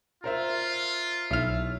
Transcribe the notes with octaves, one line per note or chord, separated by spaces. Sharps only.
F4 A#4 C5 E5
B1 E4 C#5 E5 F6